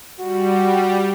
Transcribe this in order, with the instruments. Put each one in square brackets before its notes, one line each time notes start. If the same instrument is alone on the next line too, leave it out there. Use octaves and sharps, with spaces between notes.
[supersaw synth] G3 [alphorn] F#4